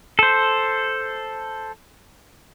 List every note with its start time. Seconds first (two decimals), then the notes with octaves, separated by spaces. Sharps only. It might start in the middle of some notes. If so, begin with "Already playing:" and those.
0.19 A4 C5